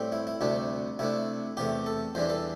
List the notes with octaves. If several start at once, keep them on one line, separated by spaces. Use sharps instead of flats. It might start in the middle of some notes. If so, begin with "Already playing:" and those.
Already playing: A2 G3 C4
E4
E4
D2 C3 G3 D4
C3 A3 D4 E4
E2 C3 A3 G4
A4
E2 E3 G3 D4 C5
A4